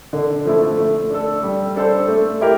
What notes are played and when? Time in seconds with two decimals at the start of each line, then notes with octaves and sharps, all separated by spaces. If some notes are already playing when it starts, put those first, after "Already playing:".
0.13 D3
0.45 F3 A3 E4
0.78 A3
1.11 D4 A4
1.43 G3
1.76 D4 A4 C5
2.08 A3
2.41 E4 G4 A#4